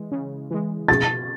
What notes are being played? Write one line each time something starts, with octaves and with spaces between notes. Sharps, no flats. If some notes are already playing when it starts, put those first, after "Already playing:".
Already playing: E3 G#3
C#3
E3 G#3
B2 A6